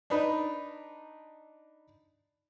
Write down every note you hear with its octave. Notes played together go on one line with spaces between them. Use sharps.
D4 D#4 B4